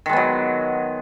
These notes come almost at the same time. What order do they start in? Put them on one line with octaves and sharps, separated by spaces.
D#3 G#3 B3 F#3